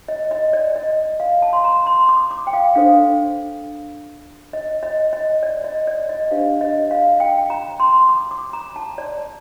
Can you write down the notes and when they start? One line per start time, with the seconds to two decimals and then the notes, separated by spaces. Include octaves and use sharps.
0.08 D#5
0.31 D#5
0.53 D5
0.76 D#5
1.20 F5
1.42 A5
1.53 C6
1.64 A#5
1.86 C6
2.09 D6
2.31 D6
2.47 G5
2.53 F5
2.75 D4 A4 C5 F5
4.53 D#5
4.83 D#5
5.13 D#5
5.43 D5
5.64 D#5
5.87 D5
6.09 D#5
6.31 D4 G4 C5 F5
6.61 D#5
6.91 F5
7.20 G5
7.50 A#5
7.80 C6
8.09 D6
8.31 D6
8.53 A#5
8.76 A5
8.98 D5